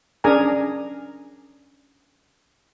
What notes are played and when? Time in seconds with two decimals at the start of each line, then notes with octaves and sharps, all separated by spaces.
0.24 C#4 D4 G#4 A#4 G#5 A#5